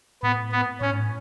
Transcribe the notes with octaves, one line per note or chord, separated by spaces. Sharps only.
A2 B3
B3
A2 C#4
G#2
A2